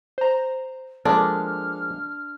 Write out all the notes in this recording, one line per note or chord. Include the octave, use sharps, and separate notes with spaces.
C5 A#5
F3 G#3 A#3 D4 A4 F6